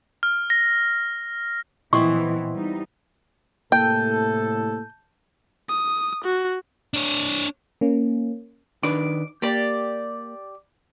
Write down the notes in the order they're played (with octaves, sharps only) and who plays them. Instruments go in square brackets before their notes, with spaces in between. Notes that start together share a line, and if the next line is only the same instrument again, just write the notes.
[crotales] F6
A#6
[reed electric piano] A#2 D#5 C6 [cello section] E3 [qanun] B3 C4 E4 [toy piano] C#6
[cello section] G3 D#4
[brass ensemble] A2 C3 A4 [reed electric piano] A#3 [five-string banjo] G5 [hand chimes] A5 G6
[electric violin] D#6
F#4
[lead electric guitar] D4 C#5
[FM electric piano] A#3 C#4
[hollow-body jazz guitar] D#3 D4 B4 [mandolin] D6
[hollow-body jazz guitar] A#3 [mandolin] G4 D5